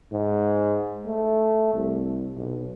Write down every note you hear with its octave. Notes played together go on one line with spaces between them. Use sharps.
G#2
A3
C2
B1